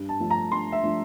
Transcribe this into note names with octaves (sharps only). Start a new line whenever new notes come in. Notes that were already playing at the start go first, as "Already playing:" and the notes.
Already playing: G2
A5
F3 A3 D4
A#5
G2 C6
E5
F3 A3 D4